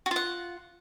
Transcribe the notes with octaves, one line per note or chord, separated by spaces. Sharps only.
F4 F#4 F#5